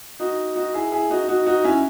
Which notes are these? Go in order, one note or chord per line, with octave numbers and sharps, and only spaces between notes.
D#4 F#4
D#4 F#4
E4 G#4
E4 G#4
D#4 F#4
D#4 F#4
D#4 F#4
C#4 E4